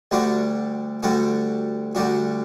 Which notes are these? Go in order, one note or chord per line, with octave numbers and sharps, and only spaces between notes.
D2 D3 G3 D4 F#4
D2 D3 G3 D4 F#4
D2 D3 G3 D4 F#4